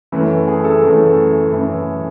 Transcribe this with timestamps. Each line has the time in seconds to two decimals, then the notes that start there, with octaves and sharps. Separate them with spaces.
0.12 F#2 E3 A3
0.48 G#4
0.64 A4
0.82 F#2 E3 A3
1.51 F#2 E3 A3